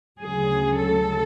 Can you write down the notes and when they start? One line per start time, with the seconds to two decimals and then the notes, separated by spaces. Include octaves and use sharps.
0.22 D2 C#3 F#3 G#4
0.80 A4